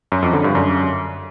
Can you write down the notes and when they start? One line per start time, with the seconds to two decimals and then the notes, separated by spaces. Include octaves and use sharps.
0.12 F#2
0.22 F2
0.33 D3
0.44 G2
0.55 F#2